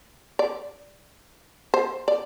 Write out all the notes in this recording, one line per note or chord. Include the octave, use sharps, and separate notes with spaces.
D5
C5
D5